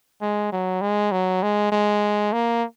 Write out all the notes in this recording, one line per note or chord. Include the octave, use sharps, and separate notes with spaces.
G#3
F#3
G#3
F#3
G#3
G#3
A#3